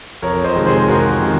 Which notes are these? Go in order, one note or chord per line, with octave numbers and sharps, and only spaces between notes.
F2 A#4 C#5
C5 D#5
C3 D#3 G#3
G#4 C5
F2 F#4 A#4
C3 D#3 G#3